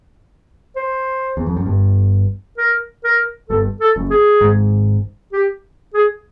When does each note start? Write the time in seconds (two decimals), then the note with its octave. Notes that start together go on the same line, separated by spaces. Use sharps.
0.76 C5
1.37 E2
1.46 F2
1.57 F#2
1.66 G1 G2
2.58 A#4
3.04 A#4
3.49 G1 G2 A4
3.80 A4
3.96 F#1 F#2
4.10 G#4
4.40 G#1 G#2
5.32 G4
5.94 G#4